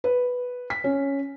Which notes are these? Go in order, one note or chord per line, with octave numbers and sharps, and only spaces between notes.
B4
B6
C#4